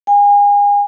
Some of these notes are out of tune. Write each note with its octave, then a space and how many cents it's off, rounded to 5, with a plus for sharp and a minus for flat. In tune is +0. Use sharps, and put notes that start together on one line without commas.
G#5 -35